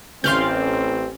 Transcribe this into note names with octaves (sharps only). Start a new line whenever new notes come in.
A1 C4 C#4 D5 F5 C6 F6 G6